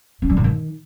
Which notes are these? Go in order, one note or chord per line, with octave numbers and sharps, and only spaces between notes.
C#4
G3
C#3
D#3